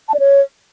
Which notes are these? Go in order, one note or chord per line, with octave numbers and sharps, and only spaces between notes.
A5
D5
C#5